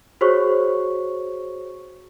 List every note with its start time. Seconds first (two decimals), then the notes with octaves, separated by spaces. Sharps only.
0.21 F#4 G#4 C5 C#5 C#6